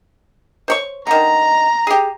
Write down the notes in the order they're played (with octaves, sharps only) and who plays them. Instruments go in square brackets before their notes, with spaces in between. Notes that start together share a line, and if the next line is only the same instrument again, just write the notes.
[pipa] C5 C#5 C#6
[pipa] D3 D#3 [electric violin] A#5
[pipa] G4 G#4